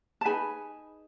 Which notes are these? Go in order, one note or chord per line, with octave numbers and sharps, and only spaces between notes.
A5
D#4 G#4 B4 G#5 B5